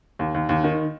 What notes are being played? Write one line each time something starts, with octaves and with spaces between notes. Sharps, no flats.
D#2
D#2
D#2
D#3